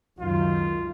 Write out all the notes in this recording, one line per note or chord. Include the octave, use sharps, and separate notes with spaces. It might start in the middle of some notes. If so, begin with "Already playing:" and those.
C#2 F#2 D#3 F4